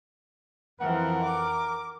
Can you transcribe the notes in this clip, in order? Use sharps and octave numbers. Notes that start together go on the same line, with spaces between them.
F2 E3 F3 C4 A#4 F#5
D6